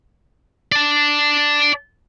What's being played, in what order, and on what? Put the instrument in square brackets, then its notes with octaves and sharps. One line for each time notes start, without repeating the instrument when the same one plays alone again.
[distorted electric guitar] D5 A5